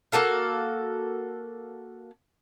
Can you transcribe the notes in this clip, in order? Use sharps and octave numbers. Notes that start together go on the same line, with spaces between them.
A#3 F#4 A4 F5